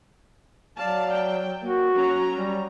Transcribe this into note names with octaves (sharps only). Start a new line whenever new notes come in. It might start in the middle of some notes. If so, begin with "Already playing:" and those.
F#3 D5 F5 A5
G5
A#3 F#4
F#3 C#4 A#5
G3